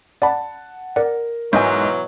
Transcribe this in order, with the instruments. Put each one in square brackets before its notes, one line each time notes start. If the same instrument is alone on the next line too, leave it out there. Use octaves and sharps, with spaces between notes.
[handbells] D5 B5 [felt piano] F#5 A5
[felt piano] A#4 [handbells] D5 F#5
[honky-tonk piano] G#2 D#5 [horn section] B2 E3 F#3 [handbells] G#5 G6